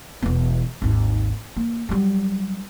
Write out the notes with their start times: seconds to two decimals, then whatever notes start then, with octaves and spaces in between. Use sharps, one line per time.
0.22 E1 B3
0.82 G#1 D#2
1.56 A#3
1.89 F#3 G3